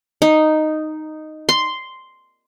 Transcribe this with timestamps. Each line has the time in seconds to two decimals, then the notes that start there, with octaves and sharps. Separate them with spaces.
0.22 D#4
1.49 C6